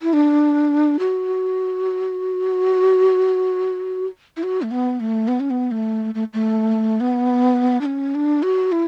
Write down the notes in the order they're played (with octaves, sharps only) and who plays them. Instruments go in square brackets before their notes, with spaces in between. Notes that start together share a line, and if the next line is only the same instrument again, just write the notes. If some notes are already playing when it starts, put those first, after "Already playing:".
[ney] E4
D4
F#4
E4
F#4
A3
B3
A3
B3
C#4
B3
A3
A3
A3
B3
D4
C#4
D4
F#4
E4